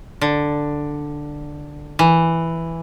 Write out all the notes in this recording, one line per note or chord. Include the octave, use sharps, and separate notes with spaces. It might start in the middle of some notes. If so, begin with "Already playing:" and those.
D3
E3